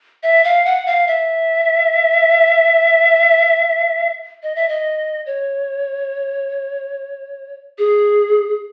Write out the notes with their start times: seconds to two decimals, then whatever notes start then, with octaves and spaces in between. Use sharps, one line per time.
0.23 E5
0.44 F5
0.65 F#5
0.86 F5
1.08 E5
4.43 D#5
4.55 E5
4.69 D#5
5.26 C#5
7.78 G#4